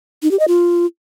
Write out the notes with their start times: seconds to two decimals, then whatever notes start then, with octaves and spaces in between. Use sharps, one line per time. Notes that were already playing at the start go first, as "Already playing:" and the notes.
0.23 D#4
0.31 G4
0.39 D#5
0.48 F4